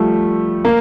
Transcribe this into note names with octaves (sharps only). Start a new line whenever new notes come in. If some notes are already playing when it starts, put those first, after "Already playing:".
Already playing: F3 G3 A3
A#3